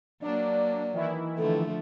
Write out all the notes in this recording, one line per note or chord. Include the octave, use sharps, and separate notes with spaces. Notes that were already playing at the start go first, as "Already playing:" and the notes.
F#3 A#3 D4 D5
D#3 E3 E4
D3 F3 A3 A4